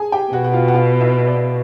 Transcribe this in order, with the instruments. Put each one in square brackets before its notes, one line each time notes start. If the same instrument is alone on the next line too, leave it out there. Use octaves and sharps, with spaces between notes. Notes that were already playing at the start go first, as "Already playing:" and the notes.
Already playing: [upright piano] G#4 G#5 A5
G4 G5
[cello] B2 [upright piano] F#4 F#5
[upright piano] F#5
F4 F5
F#5
F4 F5
E4 E5
D5